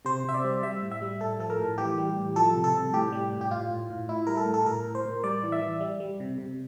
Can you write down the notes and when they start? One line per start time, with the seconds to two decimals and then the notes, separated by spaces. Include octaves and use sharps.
0.05 C3 C5
0.24 C3 E5
0.34 D5
0.44 G3
0.63 G3 E5
0.82 A2
0.91 E5
1.01 G3
1.20 A2 A4
1.39 F3 A4
1.50 A#4
1.58 A2
1.78 E3 G4
1.98 G3
2.17 A2
2.36 F3 A4
2.55 C3
2.64 A4
2.74 C3
2.93 A2 G4
3.12 G3
3.32 A2
3.41 G4
3.51 A2 F4
3.70 A2
3.90 A2
4.08 A2 E4
4.27 G3 A#4
4.37 A4
4.46 A2
4.54 A4
4.66 A2 A#4
4.85 A2
4.95 C5
5.05 A2
5.23 G3 D5
5.43 E3
5.52 E5
5.61 E3
5.80 G3
6.00 G3
6.20 C3
6.38 C3